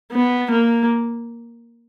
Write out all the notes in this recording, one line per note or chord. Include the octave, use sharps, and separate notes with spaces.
B3
A#3